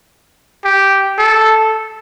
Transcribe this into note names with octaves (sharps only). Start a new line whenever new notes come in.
G4
A4